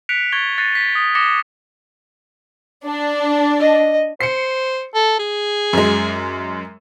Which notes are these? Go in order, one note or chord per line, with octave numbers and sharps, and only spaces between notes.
F#6 B6 C#7 D7 F7
C#6 G#6 A6 D7 G7
F#6 A6 A#6 C7 C#7 D#7
B6
D#6
D6 D#6 A#6 C#7 E7 G7
D4
D#5
C5 C7 C#7
A4
G#4
F#2 G#3